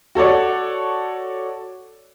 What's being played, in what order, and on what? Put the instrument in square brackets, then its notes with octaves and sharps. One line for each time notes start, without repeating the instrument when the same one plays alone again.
[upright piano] F#4 A4 C#5 D5